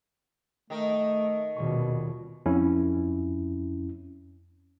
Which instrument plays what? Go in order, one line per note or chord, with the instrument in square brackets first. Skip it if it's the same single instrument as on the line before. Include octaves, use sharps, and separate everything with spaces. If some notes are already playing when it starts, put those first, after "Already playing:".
[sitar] D#3 D#4 A#4 [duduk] A3
[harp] D#1 G#4 C#6 [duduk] B2
[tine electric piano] F2 C#4 E4